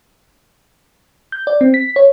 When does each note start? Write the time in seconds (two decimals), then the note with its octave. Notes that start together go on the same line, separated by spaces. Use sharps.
1.32 G6
1.47 D5
1.61 C4
1.74 B6
1.96 C#5